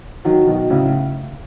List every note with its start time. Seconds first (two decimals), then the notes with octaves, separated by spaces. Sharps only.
0.25 D#3 F#3
0.47 B2 D#3
0.70 A2 C#3